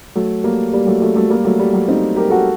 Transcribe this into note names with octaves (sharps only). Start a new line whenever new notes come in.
F#3 A3
G3 A#3
G3 A#3
F#3 A3
F#3 A3
F#3 A3
G3 A#3
F#3 A3
G3
F#3
C4 D#4
G4 A#4
F#4 A4